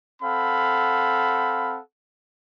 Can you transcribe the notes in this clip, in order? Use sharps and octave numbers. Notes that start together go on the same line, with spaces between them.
C4 A4 F5 F#5 B5